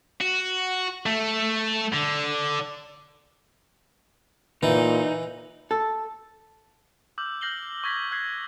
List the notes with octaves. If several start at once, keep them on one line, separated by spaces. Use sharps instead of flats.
F#4
A3
D3
A#2 E3 D#4
A4
D6 E6 F6 G6 F#7
F6 G6 A#6 C7 F#7 G7
C#6 D#6 G#6 A#6 B6
E6 F#6 G#6 B6 C7